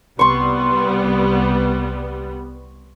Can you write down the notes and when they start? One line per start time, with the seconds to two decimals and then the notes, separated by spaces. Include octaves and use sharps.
0.19 C2 G3 B3 C6 C#6